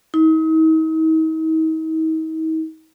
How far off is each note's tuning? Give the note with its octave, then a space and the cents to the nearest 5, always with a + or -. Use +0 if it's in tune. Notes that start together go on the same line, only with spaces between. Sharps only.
D#4 +40